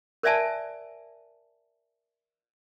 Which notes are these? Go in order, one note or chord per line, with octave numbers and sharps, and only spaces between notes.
A#4 C5 D5 E5 G#5 A5